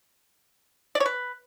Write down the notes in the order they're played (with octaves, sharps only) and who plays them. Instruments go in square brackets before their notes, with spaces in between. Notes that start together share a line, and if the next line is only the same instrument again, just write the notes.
[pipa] D5
C#5
B4